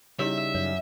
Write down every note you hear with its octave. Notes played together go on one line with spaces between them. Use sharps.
C#3 G3 D#4 E4 G4 C#5 E5
F#2 C#5